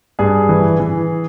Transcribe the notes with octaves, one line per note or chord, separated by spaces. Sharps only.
G2 G#4
E3
E3